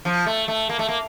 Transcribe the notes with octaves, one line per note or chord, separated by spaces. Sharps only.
F3
A3
A3
A#3
A3
A#3